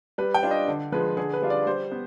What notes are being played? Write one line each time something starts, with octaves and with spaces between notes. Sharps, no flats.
G3 B4
G5
D4 F4
D#5
D3
F3 G#3 B4
D3 G#4
B4
G3 D4 F4
D5
G3 C5
B3